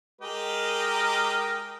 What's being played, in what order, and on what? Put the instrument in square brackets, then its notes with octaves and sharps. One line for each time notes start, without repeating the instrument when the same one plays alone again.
[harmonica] G#3 G4 D#5 [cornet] A#4